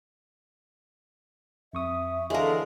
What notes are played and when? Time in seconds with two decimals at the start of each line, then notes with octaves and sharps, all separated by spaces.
1.73 F2 E5 C#6 D#6
2.30 D3 E3 G#3 A4 A#4 C#5 E5 F5